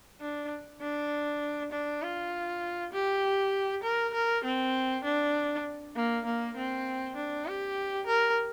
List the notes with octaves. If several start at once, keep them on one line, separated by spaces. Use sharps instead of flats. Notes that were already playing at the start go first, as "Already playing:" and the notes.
D4
D4
D4
F4
G4
A#4
A#4
C4
D4
A#3
A#3
C4
D4
G4
A#4